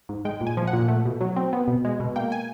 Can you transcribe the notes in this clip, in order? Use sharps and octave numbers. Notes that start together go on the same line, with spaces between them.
G#2
G#3 G5
A#2
G#5
F3
F#5
A#2
A3
B2
F#3
C4
B3
B2
G#3
B2
A#3 G5
G#5